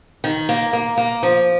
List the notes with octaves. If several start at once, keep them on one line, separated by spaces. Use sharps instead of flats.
D#3
A#3
A#3
A#3
F3